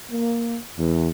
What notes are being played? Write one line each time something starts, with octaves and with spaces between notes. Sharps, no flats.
A#3
E2